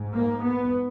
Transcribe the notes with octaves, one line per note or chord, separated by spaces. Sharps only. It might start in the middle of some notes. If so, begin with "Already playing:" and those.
Already playing: G#2
A#3
B3